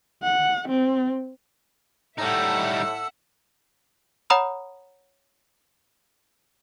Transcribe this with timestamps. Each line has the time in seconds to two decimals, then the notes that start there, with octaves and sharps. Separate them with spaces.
0.23 F#5
0.69 C4
2.18 A2 G3 D#4 A4 E5 F#5 E6
4.30 C#5 F#5 A#5 B5 D#6 F6